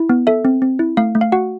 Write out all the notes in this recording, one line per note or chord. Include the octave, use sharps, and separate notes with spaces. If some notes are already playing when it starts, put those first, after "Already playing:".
Already playing: E4
B3
A4 E5
C4
C4
E4
A3 F5
A3
F5
F#4 F#5